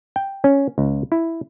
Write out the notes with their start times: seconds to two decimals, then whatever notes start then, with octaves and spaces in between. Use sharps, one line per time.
0.16 G5
0.44 C#4
0.78 C#2
1.12 E4